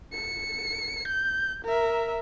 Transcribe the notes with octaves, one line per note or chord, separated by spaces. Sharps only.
C#7
G6
A#4 E5